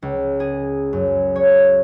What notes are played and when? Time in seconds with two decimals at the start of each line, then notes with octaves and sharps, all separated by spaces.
0.02 C#2
0.40 G#4
0.93 F#2
1.36 C#5